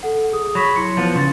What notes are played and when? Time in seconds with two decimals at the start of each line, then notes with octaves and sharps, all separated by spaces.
0.03 A4 F#5
0.33 G#4 D#6
0.55 F#3 B5 C#6 B6
0.76 E4 C6 C#7
0.97 F3 B3
1.15 C#3 C6 A6